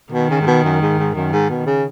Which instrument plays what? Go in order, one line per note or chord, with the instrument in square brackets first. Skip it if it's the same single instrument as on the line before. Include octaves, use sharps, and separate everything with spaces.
[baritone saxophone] B2 [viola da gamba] D#3
[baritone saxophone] C#3
G#2
B2
F#2
G#2
G#2
[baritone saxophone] F#2 [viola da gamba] D#3
[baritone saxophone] G#2
B2
C#3